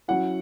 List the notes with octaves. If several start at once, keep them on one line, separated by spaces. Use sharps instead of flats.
F#3 C#4 E4 F#5